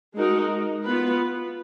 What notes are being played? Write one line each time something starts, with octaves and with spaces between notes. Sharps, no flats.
G#3 D#4 F#4 A#4
B3 F4 B4